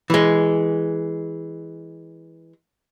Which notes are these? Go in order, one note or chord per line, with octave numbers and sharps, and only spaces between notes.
E3 G#3